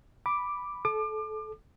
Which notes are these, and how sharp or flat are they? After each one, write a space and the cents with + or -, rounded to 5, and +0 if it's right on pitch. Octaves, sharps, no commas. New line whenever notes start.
B5 +0 D6 +0
A4 -25 D6 +30